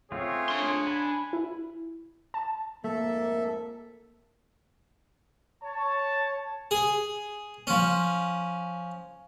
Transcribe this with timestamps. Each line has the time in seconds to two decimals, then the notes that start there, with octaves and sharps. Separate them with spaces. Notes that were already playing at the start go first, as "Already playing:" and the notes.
0.12 A3 C4 C#4 F4 G#4 C#5
0.49 D4 C6
0.87 G#5 B5
1.33 E4
2.34 A5
2.84 F2 G#2 A3 A#3 A4 E5
5.63 C#5 A5
6.71 G#4
7.67 F3 C#4